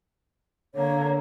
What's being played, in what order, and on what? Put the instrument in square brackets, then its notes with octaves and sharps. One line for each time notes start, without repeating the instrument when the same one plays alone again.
[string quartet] D3 A#3 [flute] C#5